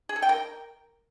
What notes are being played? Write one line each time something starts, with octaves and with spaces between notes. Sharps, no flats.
G#4
A4
G5
A#4